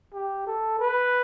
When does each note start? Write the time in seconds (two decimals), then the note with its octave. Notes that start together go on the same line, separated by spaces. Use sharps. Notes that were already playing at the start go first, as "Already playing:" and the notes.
0.14 G4
0.47 A4
0.80 B4